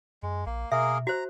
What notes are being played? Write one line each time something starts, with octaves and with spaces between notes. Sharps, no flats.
F#2 G#3
A#1 A#3
B2 A#3 G#4 A#4 E5
F#4 C5 A#5